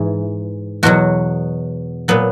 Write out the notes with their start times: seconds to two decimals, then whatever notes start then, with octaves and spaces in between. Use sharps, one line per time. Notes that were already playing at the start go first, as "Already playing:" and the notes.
Already playing: G#2 E3 G#4
0.83 E2 B2 F#3 F#4
2.08 A#2 F#3 B3